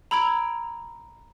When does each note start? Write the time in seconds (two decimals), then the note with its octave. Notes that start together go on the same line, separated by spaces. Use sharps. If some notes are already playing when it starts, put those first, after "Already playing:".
0.11 A#5 B5 E6 G#6 D7 F7